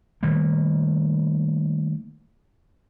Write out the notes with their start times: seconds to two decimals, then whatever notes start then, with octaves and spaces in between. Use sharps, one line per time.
0.23 D#3 G3 A3 A#3